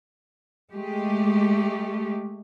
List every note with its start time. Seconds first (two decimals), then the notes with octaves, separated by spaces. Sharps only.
0.73 G#3 A3 G4